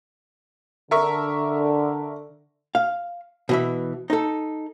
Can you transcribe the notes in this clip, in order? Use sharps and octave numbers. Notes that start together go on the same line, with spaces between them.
D3 A#4 E5 C#6
F5
B2 E3 E5
D#4 A4